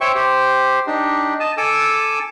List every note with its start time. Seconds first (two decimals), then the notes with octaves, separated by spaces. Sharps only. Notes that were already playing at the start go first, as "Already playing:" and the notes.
0.01 C5 C#5 E5 G5 C#6
0.15 G4 C5
0.87 D4 D#4 G4
1.40 D#5 A5
1.57 A4 G#5 D6 E6